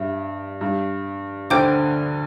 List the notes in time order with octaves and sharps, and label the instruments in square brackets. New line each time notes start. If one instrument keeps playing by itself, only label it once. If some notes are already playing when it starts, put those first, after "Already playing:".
Already playing: [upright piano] G2 [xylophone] E5
[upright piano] G2
[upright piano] D2 D3 [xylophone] C5 G5 D6 G6